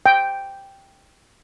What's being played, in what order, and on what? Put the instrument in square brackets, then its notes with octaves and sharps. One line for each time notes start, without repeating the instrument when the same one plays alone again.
[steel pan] G5